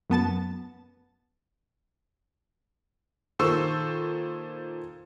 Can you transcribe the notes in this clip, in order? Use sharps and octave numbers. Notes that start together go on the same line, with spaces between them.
F#2 B3 A5 A6
A#2 D#3 A4 C5 C#6 E6